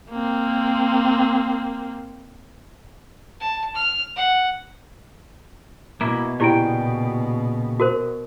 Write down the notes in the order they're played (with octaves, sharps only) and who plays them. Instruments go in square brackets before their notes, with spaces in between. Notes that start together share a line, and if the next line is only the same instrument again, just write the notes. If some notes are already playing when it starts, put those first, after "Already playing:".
[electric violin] A#3 C4
[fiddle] A5
F6
F#5
[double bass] B2 [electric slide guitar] A#3 E4
[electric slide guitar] A#2 C#3 G5 [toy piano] E4 G4 D5
[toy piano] F#4 A#4 C5